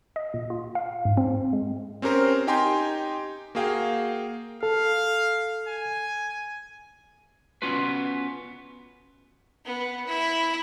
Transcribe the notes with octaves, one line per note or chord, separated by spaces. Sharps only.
D#5
A#2
F4
F5
G#2
C4
G#3
C4 C#4 G4 A#4 C5
D#4 G4 G5 G#5 A#5 C6
A#3 F#4 G#4 F5 G5
A4 F5
G#5
B3 C#4 F4 F#4 B4
B3
E4